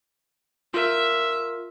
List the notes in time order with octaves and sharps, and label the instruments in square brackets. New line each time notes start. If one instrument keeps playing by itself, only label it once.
[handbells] F4 A#4 [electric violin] E5